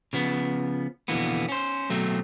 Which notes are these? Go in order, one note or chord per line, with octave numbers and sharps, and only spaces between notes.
C#3 F3 B3
F2 B2 D3 E3 A#3 B3
C#4 C5
B2 F#3 A3 C4